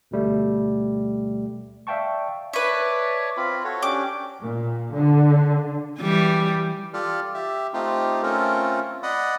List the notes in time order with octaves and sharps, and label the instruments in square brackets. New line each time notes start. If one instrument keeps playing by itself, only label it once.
[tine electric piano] D2 B2 G3 A3
D5 E5 F5 G5 A5 C#6
[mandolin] B4 E5 [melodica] C#5 D5 A5
[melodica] C4 F4 B5
F#4 A4 C#5
[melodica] C#4 D4 G4 [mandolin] D6
[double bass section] A#2
D3
[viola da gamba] E3 G3
[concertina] F4 G4 A4 D5 F6
G4 E5
A3 C4 D#4 F4 G4
A3 C4 C#4 F4 A4 A#4
D5 D#5 F#5 B5 D#6